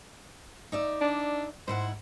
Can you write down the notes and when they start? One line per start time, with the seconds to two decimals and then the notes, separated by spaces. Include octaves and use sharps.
0.72 D#4 D5 E5
1.01 D4
1.68 G#2 E4 C5 F#5